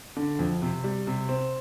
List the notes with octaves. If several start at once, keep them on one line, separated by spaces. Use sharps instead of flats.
D3
F2
C3
G3
C3
C4